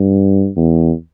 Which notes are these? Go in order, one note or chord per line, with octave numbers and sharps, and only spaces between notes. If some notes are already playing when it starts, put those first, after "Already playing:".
Already playing: G2
E2